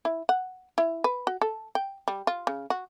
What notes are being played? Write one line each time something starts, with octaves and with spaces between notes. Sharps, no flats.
E4
F#5
E4
B4
F#4
A4
G5
G3
F4
C#3
F#4